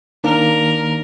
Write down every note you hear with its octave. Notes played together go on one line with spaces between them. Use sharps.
D#3 A#3 D4 A#4